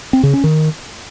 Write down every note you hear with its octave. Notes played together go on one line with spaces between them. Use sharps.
C4
C#3
C#4
D#3